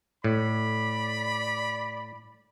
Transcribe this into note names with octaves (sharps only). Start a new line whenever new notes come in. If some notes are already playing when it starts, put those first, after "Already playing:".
A2 D5 B5